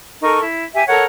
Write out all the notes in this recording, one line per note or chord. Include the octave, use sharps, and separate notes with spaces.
D#4 A4 A#4 C#6
E4
G4 E5 G#5
A4 A#4 C#5 F#5